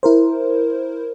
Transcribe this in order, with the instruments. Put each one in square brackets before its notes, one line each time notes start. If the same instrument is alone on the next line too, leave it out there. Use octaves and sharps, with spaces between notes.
[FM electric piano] E4 A#4 C5